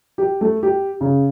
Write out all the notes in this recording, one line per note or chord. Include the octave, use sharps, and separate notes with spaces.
G4
A3
G4
C#3